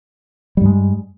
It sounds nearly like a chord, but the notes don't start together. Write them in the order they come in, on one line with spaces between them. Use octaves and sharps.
G3 G2 G#3